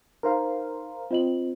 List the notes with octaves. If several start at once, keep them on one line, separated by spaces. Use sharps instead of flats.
D#4 A#4 C5 F5
C4 F4 D#5 F#7